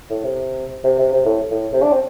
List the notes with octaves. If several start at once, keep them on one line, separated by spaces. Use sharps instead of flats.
A2
C3
C3
C3
C3
A2
A2
C3
D4
C4